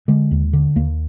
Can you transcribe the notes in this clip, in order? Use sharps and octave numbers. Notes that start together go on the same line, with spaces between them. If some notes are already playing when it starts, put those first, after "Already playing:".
D3 G#3
D#2
D3
D#2 A#3